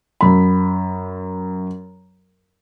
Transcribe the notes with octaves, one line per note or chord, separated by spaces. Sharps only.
F#2 B5